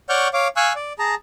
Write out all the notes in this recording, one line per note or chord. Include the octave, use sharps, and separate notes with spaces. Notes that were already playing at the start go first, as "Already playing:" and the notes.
C#5 D5 F#5 C#6 F6 G6
C#5 F5 D6
F5 G#5 C#6 E6 F#6
D5
G#4 A5 A#5